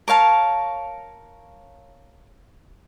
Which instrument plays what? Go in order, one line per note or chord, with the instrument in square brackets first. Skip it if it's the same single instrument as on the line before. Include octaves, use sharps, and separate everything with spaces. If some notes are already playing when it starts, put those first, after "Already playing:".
[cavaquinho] A#4 C#5 F5 A5